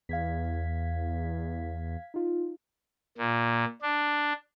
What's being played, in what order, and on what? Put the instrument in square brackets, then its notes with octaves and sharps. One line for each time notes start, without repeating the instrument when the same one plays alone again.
[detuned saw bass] E2 [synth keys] F5 G#6 B6
[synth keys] D#4 F4
[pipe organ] A#2
D4